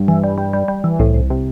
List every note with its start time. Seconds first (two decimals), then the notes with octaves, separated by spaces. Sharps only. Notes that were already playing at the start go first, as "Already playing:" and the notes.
Already playing: G2
0.08 E3
0.24 G3
0.38 G3
0.53 G3
0.68 G3
0.84 E3
0.99 C2 A2
1.14 C2
1.30 C3